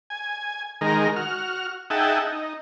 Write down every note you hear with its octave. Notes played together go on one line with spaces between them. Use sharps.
G#5
D#3 G#3 A#4
F#4 F6
D#4 G#4 E5 F#5 G5 A5
D#4